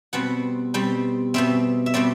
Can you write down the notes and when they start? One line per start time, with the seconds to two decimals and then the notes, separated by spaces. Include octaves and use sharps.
0.13 B2 G3 C4 F#5
0.74 B2 G3 C4
1.34 B2 G3 C4 E5
1.86 E5
1.94 B2 G3 C4 D5